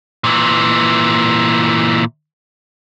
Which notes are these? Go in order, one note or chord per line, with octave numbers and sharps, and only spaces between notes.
A#2 E3